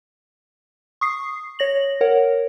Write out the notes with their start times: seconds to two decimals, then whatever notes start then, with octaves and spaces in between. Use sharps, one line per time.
1.01 C#6 D#6 C7
1.59 C#5 A#6 F#7
2.01 A#4 C#5 F#5